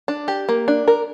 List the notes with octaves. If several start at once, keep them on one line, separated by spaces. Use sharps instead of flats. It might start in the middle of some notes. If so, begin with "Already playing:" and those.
D4
G4
A#3
D4
A#4